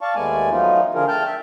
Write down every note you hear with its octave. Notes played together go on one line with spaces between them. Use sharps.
D5 F5 A5 C#6
D#2 G#3 A3 B3 D5 G#5
F3 F#3 A3 B3 D#4 F4
D3 F3 D4 F4 G#4 A#4
A3 G5 A5 F6 G6
E5